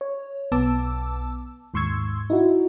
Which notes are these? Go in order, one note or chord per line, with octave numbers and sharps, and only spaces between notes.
C#5
B1 B3 A5 D6 E6
D#2 G#2 C6 C#6 E6 G#6
D#4 E4 F#4